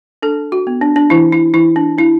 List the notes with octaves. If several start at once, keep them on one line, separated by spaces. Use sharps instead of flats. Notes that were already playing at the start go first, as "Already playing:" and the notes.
D4 A4
F#4
B3
D4
D4
E3 E4
E4
E3 E4
D4
D4 E4